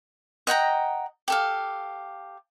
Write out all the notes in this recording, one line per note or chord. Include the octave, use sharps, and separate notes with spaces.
D#5 F#5 G5 A#5
G4 A4 F5